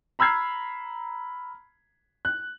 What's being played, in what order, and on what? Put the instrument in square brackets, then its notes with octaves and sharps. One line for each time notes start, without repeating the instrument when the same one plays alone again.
[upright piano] A#5 B5 E6 F6 G#6 C7
F#6